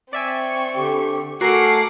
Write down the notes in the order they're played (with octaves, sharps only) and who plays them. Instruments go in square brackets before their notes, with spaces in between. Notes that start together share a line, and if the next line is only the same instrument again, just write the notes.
[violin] C4 C#6 [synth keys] D5 E5 G#5
[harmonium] D3 G4
[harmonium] A3 A4 G#5 [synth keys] F#4 A#4 [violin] F#5 D6 [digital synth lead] C7